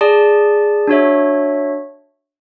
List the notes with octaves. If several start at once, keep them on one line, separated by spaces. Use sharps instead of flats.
G#4 D5 A5
D4 F#4 C#5 E5